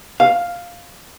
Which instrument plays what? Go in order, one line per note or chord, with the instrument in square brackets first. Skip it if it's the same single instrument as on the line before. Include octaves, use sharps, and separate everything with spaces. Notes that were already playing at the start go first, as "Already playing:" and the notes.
[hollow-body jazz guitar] F5